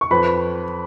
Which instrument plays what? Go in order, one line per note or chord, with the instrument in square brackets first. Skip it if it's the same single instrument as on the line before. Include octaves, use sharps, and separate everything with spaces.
[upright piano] C#6
F2 B4 B5